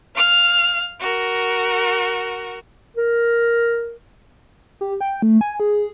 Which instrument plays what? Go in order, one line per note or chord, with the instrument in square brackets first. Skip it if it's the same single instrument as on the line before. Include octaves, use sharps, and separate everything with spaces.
[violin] F5 F6
F#4 A#4
[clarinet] A#4
[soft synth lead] G4
G5
A3
G#5
G#4